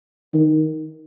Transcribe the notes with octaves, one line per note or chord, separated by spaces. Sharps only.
D#3